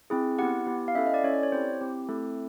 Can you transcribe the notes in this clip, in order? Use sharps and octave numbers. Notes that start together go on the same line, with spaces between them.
C4 E4 G#4
B3 E4 G4 F#5
B3 E4 G4
F5
C#4 E4 A4 E5
D#5
D5
C#4 E4 A4 C#5
D5
C#5
C4 E4 G4 C5
C4 E4 G4
A3 C4 E4 A4